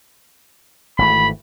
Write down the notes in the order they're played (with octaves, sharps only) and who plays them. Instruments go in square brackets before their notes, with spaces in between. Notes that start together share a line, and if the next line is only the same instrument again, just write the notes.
[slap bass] G#1 E3 A3 [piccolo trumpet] B5